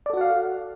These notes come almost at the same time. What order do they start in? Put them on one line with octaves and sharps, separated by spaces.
D5 A4 F#4 F#5 F5